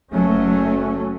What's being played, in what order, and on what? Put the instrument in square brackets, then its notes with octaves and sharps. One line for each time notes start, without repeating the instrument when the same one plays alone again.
[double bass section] F#1 F#3 A3 C#4